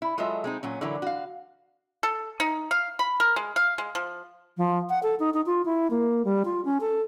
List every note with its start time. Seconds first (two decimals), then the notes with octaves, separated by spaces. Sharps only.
0.02 E4
0.18 F#3 G#3 F4 A4 D#5 E5
0.44 G#3 C4 D#4
0.63 A#2 F#3 C#4
0.81 D3 E3 F#3 E4 F#4 A#4
1.02 F#4 F5
2.03 A4
2.40 D#4
2.71 F5
2.99 B5
3.20 A#4
3.36 G#3
3.56 F5
3.78 G#3
3.95 F3
4.57 F3
4.89 F#5
5.03 A4
5.20 D#4
5.34 D#4
5.46 F4
5.65 E4
5.91 A#3
6.25 G3
6.45 F4
6.65 C#4
6.81 A4